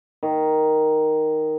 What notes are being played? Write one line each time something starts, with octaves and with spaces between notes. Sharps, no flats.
D#3